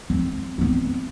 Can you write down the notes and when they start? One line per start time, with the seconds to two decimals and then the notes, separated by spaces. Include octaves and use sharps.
0.10 C4
0.58 B3 C4